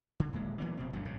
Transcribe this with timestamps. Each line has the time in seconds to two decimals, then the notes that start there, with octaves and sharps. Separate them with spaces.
0.20 D3
0.33 D#1 A#2 G#3
0.60 E3 F#3 A#3 B3
0.77 F1 B2 C4
0.93 G#1 D2 G2 F#3
1.05 A#1 G#2 C#3